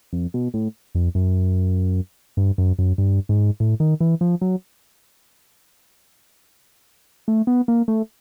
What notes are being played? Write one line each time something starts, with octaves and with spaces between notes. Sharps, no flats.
F2
B2
A2
F2
F#2
G2
F#2
F#2
G2
G#2
A2
D#3
E3
F3
F#3
A3
B3
A#3
A3